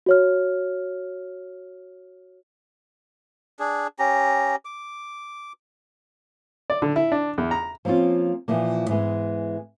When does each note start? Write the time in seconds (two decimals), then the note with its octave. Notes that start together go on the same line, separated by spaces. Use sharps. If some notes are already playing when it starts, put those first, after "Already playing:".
0.06 F#4 C#5 F6
3.59 D4 G#4
3.99 C#4 G4 A#5
4.65 D6
6.70 D5
6.82 D3
6.96 E4
7.12 D4
7.38 E2
7.51 A#5
7.85 F3 A#3 C4 C#4 F4
8.48 A#2 E3 F3 A#3
8.88 G#2 E3 G#3 B3